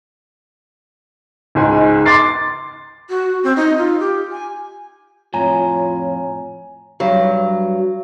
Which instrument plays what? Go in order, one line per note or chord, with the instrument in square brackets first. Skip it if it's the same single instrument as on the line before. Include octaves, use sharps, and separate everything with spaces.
[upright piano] C#2 G#2 G#5
C6 D6 A6 C7
[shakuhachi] F#4
C4
D#4
F4
G4
G#5
[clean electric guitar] F2 A2 [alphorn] F4 [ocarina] C#5 [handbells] G#5 A#5
[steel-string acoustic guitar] G2 F#3